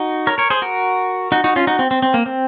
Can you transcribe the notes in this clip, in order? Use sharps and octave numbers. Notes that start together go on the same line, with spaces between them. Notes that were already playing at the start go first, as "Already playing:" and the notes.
Already playing: D#4 F#4
A#4 C#5
A#4 C#5
G#4 C5
F#4 A#4
D#4 F#4
D#4 F#4
C#4 F4
D#4 F#4
C4
C4
C4
A#3
C4